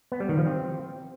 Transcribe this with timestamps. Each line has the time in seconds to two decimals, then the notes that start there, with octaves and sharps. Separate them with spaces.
0.12 B3
0.20 G3
0.29 D#3
0.38 F3
0.46 C4